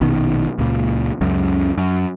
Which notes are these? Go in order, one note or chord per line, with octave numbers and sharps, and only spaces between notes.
A#1 B2 D#3
C#2 A#2
C#2 F#2 C#3
F#2